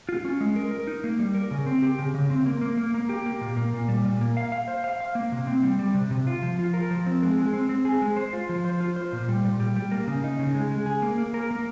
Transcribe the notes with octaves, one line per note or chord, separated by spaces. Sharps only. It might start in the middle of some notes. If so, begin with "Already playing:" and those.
F4
C#4
G#3
A#4
A#4
D#4
A#3
G3
A#4
C#3
C4
G4
C#3
C#3
C4
A#3
A#3
A#3
A#3
G4
A#3
A#2
A#3
A#2
G3
A#2
A#3
F5
F5
C5
F5
F5
A#3
C3
C4
G3
G3
C3
C3
F4
F3
F4
A#4
F3
C4
G#3
G#3
C4
C4
G#4
G#3
C5
F4
F3
C5
F4
C5
A#2
G3
A#2
G3
G3
A#3
C#3
D#4
C#3
G#3
G#3
G#4
A#3
A#3
A#4
A#3